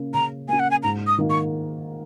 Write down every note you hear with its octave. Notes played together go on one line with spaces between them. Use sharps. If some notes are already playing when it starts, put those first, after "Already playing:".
Already playing: C#3 A#3 C#4
C#3 A#5
A#3 C#4 G#5
F#5
G#5
G#2 A#5
D#6
D#3 A#3
C#6